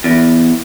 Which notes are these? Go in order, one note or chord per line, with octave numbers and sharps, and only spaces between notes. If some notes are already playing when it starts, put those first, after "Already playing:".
E2